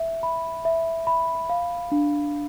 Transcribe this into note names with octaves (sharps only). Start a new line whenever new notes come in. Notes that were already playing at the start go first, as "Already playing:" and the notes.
Already playing: E5
B5
E5
B5
F5
D4